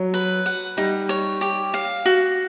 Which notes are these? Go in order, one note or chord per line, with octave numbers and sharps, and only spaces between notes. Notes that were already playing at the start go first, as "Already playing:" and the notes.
Already playing: F#3
B4
F#5
G3 D#4
C#5
G4
F5
F#4